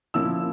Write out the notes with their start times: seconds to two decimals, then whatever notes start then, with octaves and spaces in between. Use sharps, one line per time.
0.14 F3 A#3 C#4 E4 E6